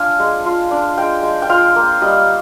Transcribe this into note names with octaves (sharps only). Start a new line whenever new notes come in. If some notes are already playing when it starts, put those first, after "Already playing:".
Already playing: D4 F4 F5 G#5
G#3
F4
D4
G#3 G5
G#3
G5
F4 F5
A#3
G3 D#5